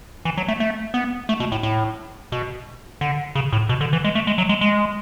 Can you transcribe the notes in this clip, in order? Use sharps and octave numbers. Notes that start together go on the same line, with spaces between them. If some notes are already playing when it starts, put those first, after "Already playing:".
E3
F#3
A3
A3
B3
A3
B2
A2
A2
B2
D3
C#3
A2
B2
D3
E3
G#3
A3
G#3
F#3
G#3
G#3